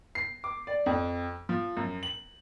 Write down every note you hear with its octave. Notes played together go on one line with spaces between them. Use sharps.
C7
D6
D5
F2
F3
F#2
F#7